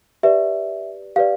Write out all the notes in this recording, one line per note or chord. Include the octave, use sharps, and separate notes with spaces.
G4 B4 D5 E5
G4 B4 D5 F5